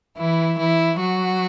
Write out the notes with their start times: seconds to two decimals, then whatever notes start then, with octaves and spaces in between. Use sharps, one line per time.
0.17 E3 E4
0.58 E3 E4
0.99 F#3 F#4